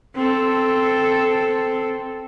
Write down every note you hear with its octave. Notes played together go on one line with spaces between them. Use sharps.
C4 A4